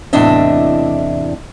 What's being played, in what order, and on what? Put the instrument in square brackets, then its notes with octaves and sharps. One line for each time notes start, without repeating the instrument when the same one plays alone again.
[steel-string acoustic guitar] E2 A2 C3 D4 D#5 E5